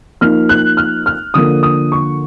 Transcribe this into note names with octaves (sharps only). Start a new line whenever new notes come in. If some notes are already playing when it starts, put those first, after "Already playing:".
F3 A#3 D#4 F6
F#6
F6
F6
D3 F3 A#3 D4 D#6
D#6
C#6